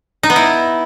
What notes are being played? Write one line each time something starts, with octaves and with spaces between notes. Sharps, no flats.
D#4
B3
E4